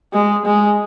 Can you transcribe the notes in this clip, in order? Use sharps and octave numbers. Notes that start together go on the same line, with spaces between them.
G#3
G#3